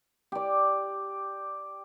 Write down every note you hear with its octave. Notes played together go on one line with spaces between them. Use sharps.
G4 D5